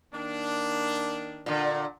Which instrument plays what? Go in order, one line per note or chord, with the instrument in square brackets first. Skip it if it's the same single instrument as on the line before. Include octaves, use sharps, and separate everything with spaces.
[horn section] D#3 A#3 D4
[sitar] A#2 D3